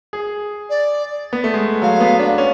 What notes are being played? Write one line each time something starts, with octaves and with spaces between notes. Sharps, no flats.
G#4
D5
B3
A3
G#3
F#3 F5
B3
D4
C#4